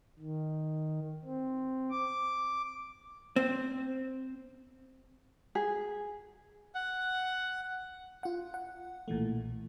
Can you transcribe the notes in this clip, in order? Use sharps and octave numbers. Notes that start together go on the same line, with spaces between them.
D#3
C4
D6
C4
G#4
F#5
F4 F#5
F#5
B1 A#2 E3 A3